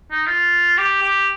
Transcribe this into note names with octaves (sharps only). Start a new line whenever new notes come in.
D#4
F4
G4
G4